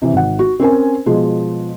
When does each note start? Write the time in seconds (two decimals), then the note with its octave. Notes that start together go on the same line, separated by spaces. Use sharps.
0.02 C3 E3
0.13 G#1 F#5
0.39 F#4
0.60 C4 C#4 A#4 G#5
1.06 B2 F3 G#3